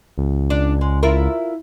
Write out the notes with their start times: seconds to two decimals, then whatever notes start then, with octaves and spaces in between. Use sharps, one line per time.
0.18 C#2
0.50 D4
0.81 G#3
1.03 E4 F4 A#4